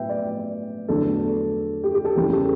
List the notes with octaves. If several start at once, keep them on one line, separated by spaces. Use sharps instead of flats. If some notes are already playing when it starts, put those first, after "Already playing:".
Already playing: A2 F#3 B3 B4 E5 G5
D5
E2 D3 F#3 A3 A4
G4
G4
A4
E2 C#3 E3 G3 B3 G4
A4